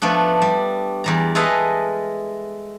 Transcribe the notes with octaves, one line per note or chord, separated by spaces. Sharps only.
F3 A3 B3 D4
G3
E2 G3 A#5
G#3 E4 A4 B4 D#5 F5